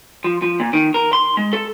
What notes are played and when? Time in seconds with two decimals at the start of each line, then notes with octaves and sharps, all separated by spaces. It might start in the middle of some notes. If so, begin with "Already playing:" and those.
0.24 F3
0.42 F3
0.60 A#2
0.73 D#3
0.94 A#4
1.13 C6
1.37 G#3
1.53 A4